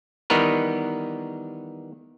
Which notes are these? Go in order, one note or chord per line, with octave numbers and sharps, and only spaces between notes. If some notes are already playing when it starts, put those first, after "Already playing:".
D#3 E3 G3 B3 A#4 B4